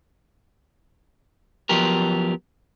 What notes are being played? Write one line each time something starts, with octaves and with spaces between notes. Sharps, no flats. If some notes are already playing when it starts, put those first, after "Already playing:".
F3 F#3 B3 G4 A#4